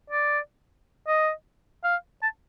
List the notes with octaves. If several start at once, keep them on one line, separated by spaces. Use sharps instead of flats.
D5
D#5
F5
A5